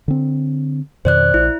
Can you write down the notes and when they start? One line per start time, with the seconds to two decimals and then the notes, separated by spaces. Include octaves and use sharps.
0.08 D3 C4
1.05 F2 B2 D#3 C5 D5 F#6
1.34 A#1 E4